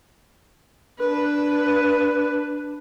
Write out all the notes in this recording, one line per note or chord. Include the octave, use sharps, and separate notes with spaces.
D4 B4